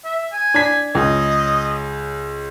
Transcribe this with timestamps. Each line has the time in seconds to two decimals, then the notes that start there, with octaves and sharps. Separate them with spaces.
0.04 E5
0.33 G#5
0.54 D4 G#6 B6
0.95 C#2 D#5